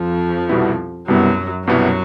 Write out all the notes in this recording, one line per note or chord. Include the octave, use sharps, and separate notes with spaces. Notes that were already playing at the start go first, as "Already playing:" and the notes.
Already playing: F2 F3
C2 B2 G3 B3 E4
C2 F#2 B2 F#3 G3 B3 E4
C2 F#2 B2 F#3 G3 B3 E4